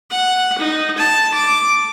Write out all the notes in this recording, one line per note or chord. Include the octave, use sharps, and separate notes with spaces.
F#5
D#4
A5
D6